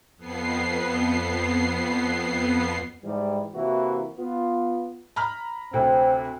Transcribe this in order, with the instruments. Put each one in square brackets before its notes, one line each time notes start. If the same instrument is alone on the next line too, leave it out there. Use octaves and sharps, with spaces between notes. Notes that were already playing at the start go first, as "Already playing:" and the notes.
[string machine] F2 B3 C7
[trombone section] G#2 E3 G3
C3 E3 A#3 E4 F#4
B3 F4
[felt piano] A#5 B5 F6
[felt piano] D2 C3 [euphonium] C4